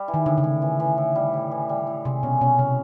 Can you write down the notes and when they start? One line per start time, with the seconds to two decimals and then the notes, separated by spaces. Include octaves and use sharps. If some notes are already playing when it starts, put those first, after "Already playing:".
Already playing: G3
0.08 E3
0.14 D#3
0.26 A2 D3
0.38 C#3
0.44 A2
0.62 E3
0.80 E3
0.98 A2
1.15 G3
1.34 A2
1.52 E3
1.69 G3
1.87 A2
2.05 C3 G#3
2.23 B2 C#4
2.41 B2 C#4
2.59 C3 C#4